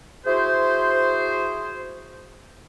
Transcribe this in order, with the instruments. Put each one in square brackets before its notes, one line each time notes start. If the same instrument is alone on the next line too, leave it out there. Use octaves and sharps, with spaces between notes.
[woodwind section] E4 F#4 G#4 C5